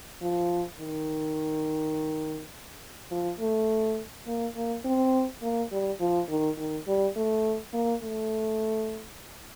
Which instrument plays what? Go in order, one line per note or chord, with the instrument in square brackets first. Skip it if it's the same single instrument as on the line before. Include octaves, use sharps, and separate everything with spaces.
[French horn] F3
D#3
F3
A3
A#3
A#3
C4
A#3
G3
F3
D#3
D#3
G3
A3
A#3
A3